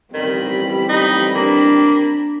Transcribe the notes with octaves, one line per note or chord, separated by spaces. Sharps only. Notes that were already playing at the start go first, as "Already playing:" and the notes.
A1 D#3 G3 C4 B5
D#4
A#3 D4